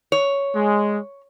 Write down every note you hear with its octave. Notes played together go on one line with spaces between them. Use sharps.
C#5
G#3